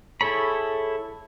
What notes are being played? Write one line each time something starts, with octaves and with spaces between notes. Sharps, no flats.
E4 G#4 A4 C#5 B5